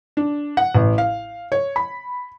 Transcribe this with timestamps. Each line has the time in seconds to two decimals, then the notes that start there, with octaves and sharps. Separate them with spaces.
0.17 D4
0.57 F#5
0.75 A1
0.98 F5
1.52 C#5
1.76 B5